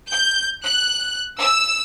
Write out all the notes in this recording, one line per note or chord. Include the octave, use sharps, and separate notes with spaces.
G6
F#6
E6